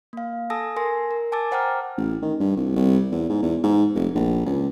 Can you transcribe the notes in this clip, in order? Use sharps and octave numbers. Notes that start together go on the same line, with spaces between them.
A#3 F5
A4 G#5 A5 D#6 E6 A#6
A#4 G#5 C6 A#6
A#4
G#5 A5 D6 E6 A6
C5 F#5 G5 A#5 D6 F6
A1
D#3
G2
C2
C2
E2
G#2
E2
G#2
F1
A#1
C#2